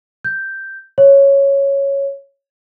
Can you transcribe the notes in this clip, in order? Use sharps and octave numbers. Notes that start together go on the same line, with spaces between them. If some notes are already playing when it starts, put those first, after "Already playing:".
G6
C#5